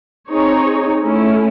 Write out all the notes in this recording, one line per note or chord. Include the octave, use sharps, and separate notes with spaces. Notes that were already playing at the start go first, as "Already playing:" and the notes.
C4 D#4 G#4 C#5
A3 C#4 E4